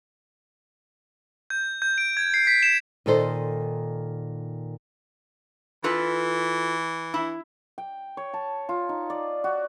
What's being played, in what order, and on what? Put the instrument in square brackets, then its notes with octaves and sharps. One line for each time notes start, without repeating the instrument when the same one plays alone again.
[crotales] G6
G6
D7
G#6
C7
B6
E7
[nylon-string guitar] A#2 D#3 D#4 A4 C5
[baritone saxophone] E3 [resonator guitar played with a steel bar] F4 A4 B4
[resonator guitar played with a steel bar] E4
[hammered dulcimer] G5
C#5
A5
F4
D#4
D5
F#4